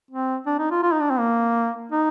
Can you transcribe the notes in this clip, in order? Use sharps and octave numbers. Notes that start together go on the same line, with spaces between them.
C4
D4
D#4
F4
F4
D#4
D4
C4
A#3
D#4